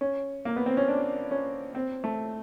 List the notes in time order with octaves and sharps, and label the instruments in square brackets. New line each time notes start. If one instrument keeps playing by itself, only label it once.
[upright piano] C#4
A#3
B3
C4
C#4
D4
C#4
C4
A3